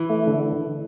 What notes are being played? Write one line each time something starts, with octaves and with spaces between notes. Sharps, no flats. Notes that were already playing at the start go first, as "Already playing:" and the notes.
Already playing: E3
A3
D3